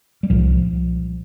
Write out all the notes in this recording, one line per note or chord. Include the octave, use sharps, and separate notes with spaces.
G3
C2 A#2 F3